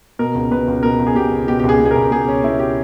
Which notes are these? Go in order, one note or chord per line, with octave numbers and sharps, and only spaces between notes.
B2 A#4
C#2
B2 B4
C#2
B2 A#4
C#2
G#4
B2 G4
C#2
B2 G4
C#2 G4
G#4
B2
G#4
A#4
C#2
B2 G#4
C#2 C#4
B2 E4
G4